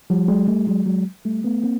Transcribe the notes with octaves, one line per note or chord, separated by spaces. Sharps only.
F3 G3
F#3 G#3
G3 A3
F#3 G#3
F#3 G#3
G3 A3
A3 B3
A#3 C4